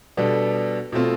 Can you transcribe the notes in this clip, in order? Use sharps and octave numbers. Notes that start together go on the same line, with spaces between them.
B2 G3 B3 D4 A4
B2 A3 C4 F4